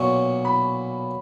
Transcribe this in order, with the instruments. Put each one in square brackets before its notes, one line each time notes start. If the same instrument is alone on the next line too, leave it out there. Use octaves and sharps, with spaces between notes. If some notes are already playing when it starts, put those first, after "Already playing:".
Already playing: [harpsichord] B1 A#2 F#3 [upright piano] C#6
[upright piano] B5